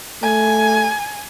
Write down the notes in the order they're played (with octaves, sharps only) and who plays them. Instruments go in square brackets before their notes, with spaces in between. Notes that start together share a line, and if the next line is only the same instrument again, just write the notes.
[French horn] A3 [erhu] G#5